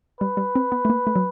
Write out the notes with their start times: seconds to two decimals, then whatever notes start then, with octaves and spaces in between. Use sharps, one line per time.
0.21 G3 B4
0.37 G3
0.55 C4
0.72 B3
0.85 A3
0.90 A#3
1.07 A3
1.16 F#3